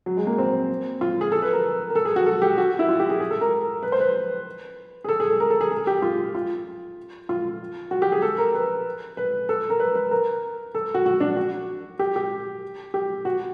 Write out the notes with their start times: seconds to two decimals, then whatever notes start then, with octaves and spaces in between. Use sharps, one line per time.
0.06 F#3
0.17 G#3
0.27 A#3
0.38 C4
1.01 F4
1.21 G#4
1.32 A4
1.42 B4
1.53 A#4
1.90 A#4
1.95 A4
2.05 G#4
2.16 F#4
2.26 A4
2.42 G4
2.58 F#4
2.79 E4
2.89 F4
3.00 G4
3.10 G#4
3.20 G#4
3.31 A4
3.41 A#4
3.83 B4
3.92 C5
4.00 B4
5.04 G#4
5.09 A4
5.20 G#4
5.30 A4
5.40 A#4
5.50 A4
5.61 G#4
5.71 G#4
5.87 G4
6.02 F4
6.35 F4
7.29 F4
7.91 F#4
8.02 G4
8.12 G#4
8.22 A4
8.38 A#4
8.54 B4
9.17 B4
9.49 A4
9.70 A#4
9.80 B4
9.95 B4
10.11 A#4
10.75 A4
10.94 F#4
11.06 F#4
11.20 D4
11.36 F#4
11.99 G4
12.16 G4
12.94 G4
13.25 F#4